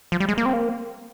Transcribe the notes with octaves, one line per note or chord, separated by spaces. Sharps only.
F3
G3
G#3
A#3
C4
A#3